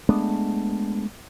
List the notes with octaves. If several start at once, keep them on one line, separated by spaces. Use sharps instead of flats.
G#3 A3 B3 D4